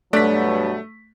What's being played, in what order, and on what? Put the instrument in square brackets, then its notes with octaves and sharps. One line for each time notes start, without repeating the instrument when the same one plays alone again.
[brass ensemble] G2 B2 F#3 [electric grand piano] A3 B6 [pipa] D4 D5